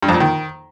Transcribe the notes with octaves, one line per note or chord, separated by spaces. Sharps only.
G2
F2
A#2
D#3